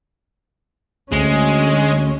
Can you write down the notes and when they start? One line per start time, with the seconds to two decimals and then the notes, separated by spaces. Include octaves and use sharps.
1.12 D2 G#3 C#4